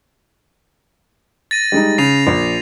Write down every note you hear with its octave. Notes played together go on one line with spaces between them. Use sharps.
A6 A#6 D#7
G3 G#3 D#4
C#3 C7 D#7 F7
A#1